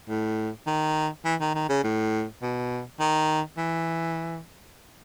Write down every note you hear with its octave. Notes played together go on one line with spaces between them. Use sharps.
A2
D#3
E3
D#3
D#3
C#3
A2
B2
D#3
E3